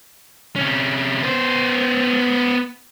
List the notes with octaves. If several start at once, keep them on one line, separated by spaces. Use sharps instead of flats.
C3 C#4
B3 C5